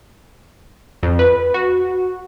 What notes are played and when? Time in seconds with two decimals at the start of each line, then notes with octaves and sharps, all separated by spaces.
1.03 F2
1.19 B4
1.54 F#4